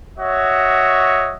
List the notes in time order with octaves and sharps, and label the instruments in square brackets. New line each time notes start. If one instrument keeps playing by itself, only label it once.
[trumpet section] F#4 C#5 D#5 E5